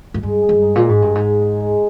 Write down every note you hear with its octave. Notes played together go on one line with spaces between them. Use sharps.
G#2
G2 G#3
G#4
G2
D#4
A#2
G#3
G#2
G2 G#3
G#2
G#4
D#4
G#3